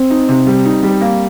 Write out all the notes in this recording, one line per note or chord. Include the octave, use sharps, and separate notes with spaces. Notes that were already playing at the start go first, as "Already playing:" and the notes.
Already playing: C4
D#4
C3
G3
D#4
G3
A#3